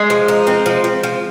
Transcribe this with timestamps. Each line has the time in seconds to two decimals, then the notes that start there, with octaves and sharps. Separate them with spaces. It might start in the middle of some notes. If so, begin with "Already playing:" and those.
Already playing: G#3
0.10 F3
0.28 D#4
0.47 C4
0.66 F3
0.84 F3
1.03 F3